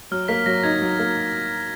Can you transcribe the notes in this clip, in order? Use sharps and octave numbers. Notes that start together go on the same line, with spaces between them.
F#3 F6
A#3 B6
F#3 A#6
D#4 G#6
F#3
A#3